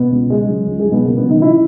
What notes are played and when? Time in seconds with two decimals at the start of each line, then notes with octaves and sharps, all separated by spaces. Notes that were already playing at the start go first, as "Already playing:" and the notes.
Already playing: B2 B3
0.11 C#2
0.30 C#3 G#3
0.48 F#3
0.67 C#2
0.79 G#3 G#4
0.86 F#3
0.92 B2 B3
1.05 C#3 A#3
1.17 B2 B3
1.23 F#3
1.29 D#3 D#4
1.42 C#3 E3 E4